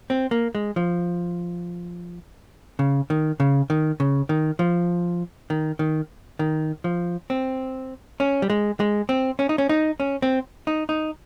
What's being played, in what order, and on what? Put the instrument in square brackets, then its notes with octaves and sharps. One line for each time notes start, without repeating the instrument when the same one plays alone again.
[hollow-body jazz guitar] C4
A#3
G#3
F3
C#3
D#3
C#3
D#3
C#3
D#3
F3
D#3
D#3
D#3
F3
C4
C#4
G3
G#3
G#3
C4
C#4
D#4
C#4
D#4
C#4
C4
D#4
D#4